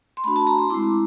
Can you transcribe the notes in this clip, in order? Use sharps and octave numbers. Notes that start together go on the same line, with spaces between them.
C6
A3 D4 F#4 B5
A5
A#5
C6
G#3 C4 E4 D6